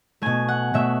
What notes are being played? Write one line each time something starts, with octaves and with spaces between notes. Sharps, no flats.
B2 A3 G#5
F#5
B2 A3 E5